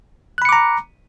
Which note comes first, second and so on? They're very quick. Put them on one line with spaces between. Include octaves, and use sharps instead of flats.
F#6 B5 C#7 D6 A#5